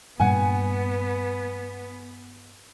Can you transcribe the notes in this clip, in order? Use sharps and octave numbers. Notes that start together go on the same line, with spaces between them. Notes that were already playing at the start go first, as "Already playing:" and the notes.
G2 A#2 G3 B3 F#5 G#5